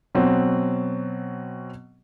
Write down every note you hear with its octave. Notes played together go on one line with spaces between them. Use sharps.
B2 F#3 C4